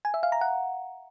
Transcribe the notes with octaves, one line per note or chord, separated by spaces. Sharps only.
G#5
E5
F5
A#5
F#5